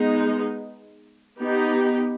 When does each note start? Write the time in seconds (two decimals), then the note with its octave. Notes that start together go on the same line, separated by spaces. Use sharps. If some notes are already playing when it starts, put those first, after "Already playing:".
Already playing: G#3 B3 D#4
1.41 B3 D#4 G4